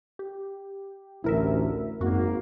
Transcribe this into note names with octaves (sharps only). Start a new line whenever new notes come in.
G4
A1 D2 E4 A#4 E5
G#1 F#2 A#3 F#4